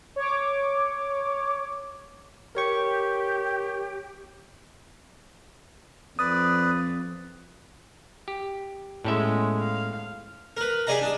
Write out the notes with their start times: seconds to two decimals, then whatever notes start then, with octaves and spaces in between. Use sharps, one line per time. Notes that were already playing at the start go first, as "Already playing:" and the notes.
0.16 C#5 D6
2.55 G4 A#4 C#5 C#6
6.19 F2 B4 D5 D#6
8.28 G4
9.04 A2 G#3 B3 C#4 E5
9.59 F5
10.57 A#4 B4
10.87 G4 G#4 D5 D#5 A#5
11.01 D4 D#6